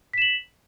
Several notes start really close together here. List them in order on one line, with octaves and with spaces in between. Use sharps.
B6 E7 F#7